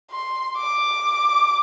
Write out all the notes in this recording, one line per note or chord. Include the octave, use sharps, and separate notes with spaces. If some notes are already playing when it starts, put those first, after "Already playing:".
C6
D6